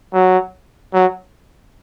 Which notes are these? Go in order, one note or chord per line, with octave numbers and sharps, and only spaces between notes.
F#3
F#3